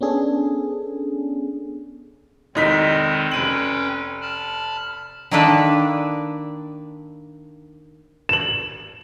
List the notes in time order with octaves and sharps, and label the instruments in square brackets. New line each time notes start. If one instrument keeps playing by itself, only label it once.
[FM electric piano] B3 C#4 D4 G#4 A4
[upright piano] F1 D#4 B6 [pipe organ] D#3 G#3 C4
[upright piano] F1 D#7 F#7 [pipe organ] C#4 B4 G5
[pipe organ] A5 B5 F6
[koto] D#3 A#3 D4 A4 B4 D5
[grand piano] E7 F#7